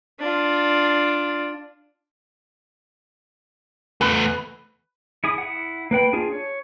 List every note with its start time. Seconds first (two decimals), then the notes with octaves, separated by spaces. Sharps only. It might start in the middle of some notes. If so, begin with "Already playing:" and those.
0.19 D4 F4
4.01 E2 A3 B4
5.24 E4 G#4 D#6
5.38 E4 F#5
5.91 A#3 B4 G5 B5
6.13 D4 F4 G#4
6.32 C#5